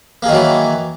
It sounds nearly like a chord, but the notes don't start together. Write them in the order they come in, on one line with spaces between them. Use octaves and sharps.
A#3 G#4 D#3 F#3 E3